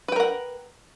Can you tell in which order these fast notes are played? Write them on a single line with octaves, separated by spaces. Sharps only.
B4 G5 A#4 F#5